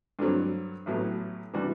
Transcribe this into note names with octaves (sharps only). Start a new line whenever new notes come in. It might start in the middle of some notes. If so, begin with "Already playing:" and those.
G2 D3 F#3 C4
A1 A2 F#3 B3
C3 E3 G3 D4 F#4